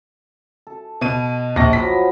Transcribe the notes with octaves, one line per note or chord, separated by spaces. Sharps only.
A4
B2 D#7
A#1 A#6
F3 F#3 B3 B6